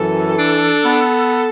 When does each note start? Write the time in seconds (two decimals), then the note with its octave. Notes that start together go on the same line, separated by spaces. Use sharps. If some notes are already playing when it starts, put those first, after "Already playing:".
Already playing: F#2 E3 A4
0.37 D4
0.84 B3